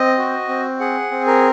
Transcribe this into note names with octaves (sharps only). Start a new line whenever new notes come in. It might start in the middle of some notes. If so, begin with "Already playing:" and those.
Already playing: C4 D#5
F#4
C4
G#4 F#5
C4
A#4